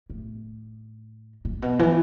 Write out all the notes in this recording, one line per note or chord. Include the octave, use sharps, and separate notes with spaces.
A2
A#2
B2
E3